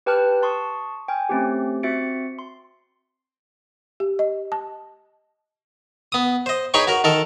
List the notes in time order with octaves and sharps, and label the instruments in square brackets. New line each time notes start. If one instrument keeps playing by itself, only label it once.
[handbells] G4 B4 G5 A5 F6 F#6
A5 C6 C#6 D#6
G5 G#5 F6
A3 C4 C#4 G4
C4 F#4 E5 A6 C#7 D7
C6
[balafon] G4
D#5
A5
[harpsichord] B3 D#6
C5 D#5
D#4 G#4 B4 C#5 G5 C#6
F#4 A#4
D#3 A4 A#4